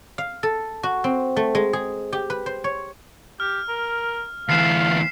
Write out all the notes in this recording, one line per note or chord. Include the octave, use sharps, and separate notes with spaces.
F5
A4
F#4
C4
A3
G#3
G#4
G4
B4
C5
C#5
G4 F6
A#4
D2 E3 F5 B6 C7 E7